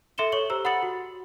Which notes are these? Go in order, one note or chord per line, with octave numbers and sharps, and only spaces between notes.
A4 E5 C6 C#7 E7 G7
A4 C#5 C#6 F#7 G7
G4 C5 A#5 E6
F#5 B5 D#6 A6 C#7 F#7
F#4